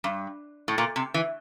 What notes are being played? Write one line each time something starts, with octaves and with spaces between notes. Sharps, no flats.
G2
A2
A#2
C3
E3